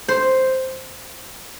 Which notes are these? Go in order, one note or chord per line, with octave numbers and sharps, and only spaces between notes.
C5